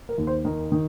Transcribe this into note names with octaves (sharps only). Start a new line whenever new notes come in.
A#4
D#2
C5
D#3 A#4
D#3